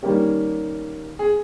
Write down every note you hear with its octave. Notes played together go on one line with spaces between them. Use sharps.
D#3 G3 A#3 C#4 G4
G#4